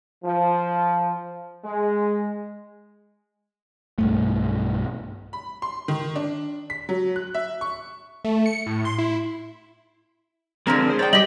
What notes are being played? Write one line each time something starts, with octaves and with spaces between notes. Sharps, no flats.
F3
G#3
B1 G2 A3
B5
C6
D#3
D4
B6
F#3
F#6
E5
C#6
A3
C#7
A2
C6
E4
D3 F3 G#3 C4 D4 A#4
G#4 C5
C#5 D5 G5
G3 G4 D#5 B6 F#7